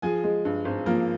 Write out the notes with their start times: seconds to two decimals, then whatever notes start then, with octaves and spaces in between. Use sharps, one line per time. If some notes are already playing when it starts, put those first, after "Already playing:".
0.02 F3 G#4 G#5
0.24 G#3
0.45 G2
0.65 G#1
0.86 F3 A#3 A#4